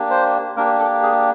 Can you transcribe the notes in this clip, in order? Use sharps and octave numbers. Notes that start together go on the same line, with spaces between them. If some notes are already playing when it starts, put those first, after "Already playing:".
Already playing: A#3 D4 G4
C5
A#3 D4 G4 A#4
A4
G#4